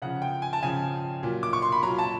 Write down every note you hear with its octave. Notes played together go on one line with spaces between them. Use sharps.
C#3 F3 F#5
G5
G#5
A5
C#3 F3 G#5
A#2 F#3
D6
C#6
C6
B5
A#2 F#3 A#5
A5